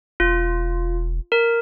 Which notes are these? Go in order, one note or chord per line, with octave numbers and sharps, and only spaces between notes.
E1 F4
A#4